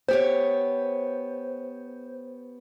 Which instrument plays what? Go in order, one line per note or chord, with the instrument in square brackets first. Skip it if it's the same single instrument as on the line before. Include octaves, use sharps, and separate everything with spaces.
[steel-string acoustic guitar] B3 G4 C#5 [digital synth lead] C5